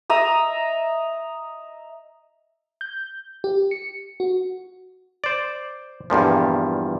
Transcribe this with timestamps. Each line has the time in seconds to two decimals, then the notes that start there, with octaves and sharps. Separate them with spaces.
0.10 D#5 E5 A#5 D#6
2.81 G6
3.44 G4
3.71 C#7
4.20 F#4
5.24 C5 D5
6.10 E2 G2 A#2 F3